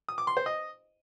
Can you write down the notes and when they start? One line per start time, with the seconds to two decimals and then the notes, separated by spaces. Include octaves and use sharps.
0.09 D#6
0.18 D6
0.27 C6
0.37 C5
0.46 D#5